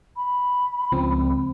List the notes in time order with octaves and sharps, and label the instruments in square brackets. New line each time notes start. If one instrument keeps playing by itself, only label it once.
[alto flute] B5
[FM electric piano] C#2 F3 C4